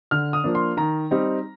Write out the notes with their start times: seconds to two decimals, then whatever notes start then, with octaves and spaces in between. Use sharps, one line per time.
0.11 D3 F6
0.33 D#6
0.44 F3 A#3 D4
0.55 C6
0.77 D#3 A#5
1.11 G3 C4 D#4